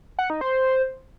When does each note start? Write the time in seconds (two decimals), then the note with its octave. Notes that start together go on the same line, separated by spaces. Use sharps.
0.19 F#5
0.30 D#4
0.41 C5